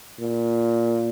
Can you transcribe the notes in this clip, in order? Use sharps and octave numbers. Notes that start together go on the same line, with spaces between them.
A#2